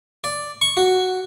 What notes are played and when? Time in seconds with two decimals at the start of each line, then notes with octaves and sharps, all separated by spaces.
0.24 D5
0.61 C#6
0.77 F#4